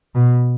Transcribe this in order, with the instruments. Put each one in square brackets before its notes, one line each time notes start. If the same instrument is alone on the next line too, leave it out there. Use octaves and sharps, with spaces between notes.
[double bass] B2